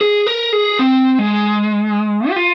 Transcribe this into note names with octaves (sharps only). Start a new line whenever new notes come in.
G#4
A#4
G#4
C4
G#3
G4
F4